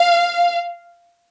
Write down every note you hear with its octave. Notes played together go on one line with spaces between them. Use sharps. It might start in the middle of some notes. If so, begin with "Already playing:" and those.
Already playing: F5